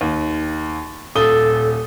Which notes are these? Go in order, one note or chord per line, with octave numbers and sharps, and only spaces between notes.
D#2
D#1 A4 D#6 G7